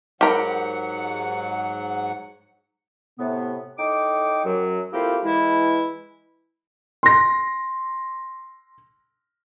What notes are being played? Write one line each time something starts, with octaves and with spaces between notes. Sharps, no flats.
G#2 F#3 G4 A#4 F#5 B5
A2 C3 B3
A2 D#4 G5 D6
F#2 F#3
A3 A#3 C4 E4 F4 G4
E3 G#3 E4
C6 A#6